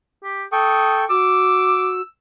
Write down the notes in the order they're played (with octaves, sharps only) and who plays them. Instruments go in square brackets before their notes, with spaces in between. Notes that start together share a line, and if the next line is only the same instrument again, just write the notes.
[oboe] G4
[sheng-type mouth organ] A4 G5 C#6 [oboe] D#6
[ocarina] F#4 [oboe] D6 [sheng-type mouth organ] E6